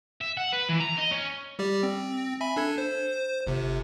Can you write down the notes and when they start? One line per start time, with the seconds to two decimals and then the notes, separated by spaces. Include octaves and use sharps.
0.21 E5
0.37 F#5
0.53 B4
0.69 E3
0.80 A#5
0.98 D#5
1.11 C#4
1.59 G3 G4 D5
1.83 C4
2.41 E5 G#5 B5
2.56 D4 A4 G#6
2.78 C5
3.47 G1 C3